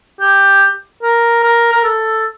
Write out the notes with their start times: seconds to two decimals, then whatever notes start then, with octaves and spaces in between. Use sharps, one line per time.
0.21 G4
1.02 A#4
1.43 A#4
1.72 A#4
1.84 A4